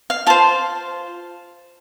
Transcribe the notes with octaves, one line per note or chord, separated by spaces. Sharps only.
F5
F4 C5 A5